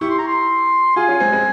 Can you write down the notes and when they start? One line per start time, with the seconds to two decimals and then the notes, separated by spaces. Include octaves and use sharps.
0.01 E4 G4 C#6
0.10 C6
0.18 A#5
0.28 C6
0.96 F4 G#4 G#5
1.08 C#4 F4
1.20 G#3 C4
1.32 G#3 C4